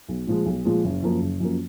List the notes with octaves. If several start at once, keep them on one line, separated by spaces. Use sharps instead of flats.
B1
A#2 F3 G#3
B1
A#2 F3 G#3
F#1
F#2 F3 A#3
F#1
F#2 F3 A#3